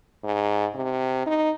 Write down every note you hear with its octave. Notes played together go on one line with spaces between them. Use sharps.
G#2
C3
D#4